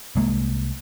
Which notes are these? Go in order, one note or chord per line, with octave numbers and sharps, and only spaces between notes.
C2 G#3 A#3